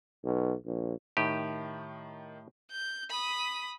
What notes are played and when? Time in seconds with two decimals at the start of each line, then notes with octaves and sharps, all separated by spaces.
0.24 B1
0.65 A#1
1.17 A2 D#3 D#4 G4 D#7
2.72 G6
3.10 B5 D#6